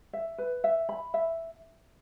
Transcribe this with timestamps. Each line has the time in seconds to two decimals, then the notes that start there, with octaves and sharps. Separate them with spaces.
0.13 E5
0.38 B4
0.64 E5
0.89 B5
1.14 E5